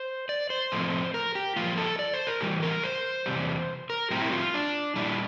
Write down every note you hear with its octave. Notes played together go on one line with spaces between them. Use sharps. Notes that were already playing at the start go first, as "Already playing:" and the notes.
Already playing: C5
D5
C5
A2 F3 A3 C4
A#4
G4
G2 F3 A#3 F4
A4
D5
C5
A#4
A2 E3 G3 G4
A#4
C5
E2 C3 G3
A#4
A2 G3 C4 G4
E4
F4
D4
A#2 G3 D4 E4